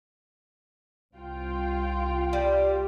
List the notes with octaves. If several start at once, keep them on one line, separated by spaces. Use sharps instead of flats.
C2 F4 G5
G3